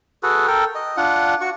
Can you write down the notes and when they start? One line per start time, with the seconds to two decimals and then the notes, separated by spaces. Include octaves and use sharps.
0.23 F#4 G#4 A4 B4
0.47 A4 A#4 G5
0.75 D#5
0.97 D4 F4 F#5
1.41 F#4 C#6